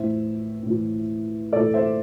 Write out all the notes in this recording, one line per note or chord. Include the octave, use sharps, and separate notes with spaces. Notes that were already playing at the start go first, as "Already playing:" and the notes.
Already playing: A2 E3 C5 E5
A2 E3
A2 E3 A4 D5
C5 E5